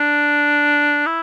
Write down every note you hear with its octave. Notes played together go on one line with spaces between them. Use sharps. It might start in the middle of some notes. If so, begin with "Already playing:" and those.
Already playing: D4
E4